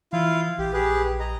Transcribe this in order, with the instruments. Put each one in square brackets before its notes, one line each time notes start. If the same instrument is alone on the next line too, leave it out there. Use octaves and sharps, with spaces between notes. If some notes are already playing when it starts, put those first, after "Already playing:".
[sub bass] E3 [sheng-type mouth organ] E4 F4 F5
[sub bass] A#1 [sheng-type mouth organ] G4
[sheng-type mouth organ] G4 G#4 B4
D#5 A#5